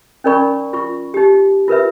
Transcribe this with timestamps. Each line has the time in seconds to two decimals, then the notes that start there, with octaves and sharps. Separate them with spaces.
0.24 C#4 D#4 A#4 D5 B5 C#6
0.73 F4 C#6
1.14 D#4 G4
1.68 F4 A#4 B4 E5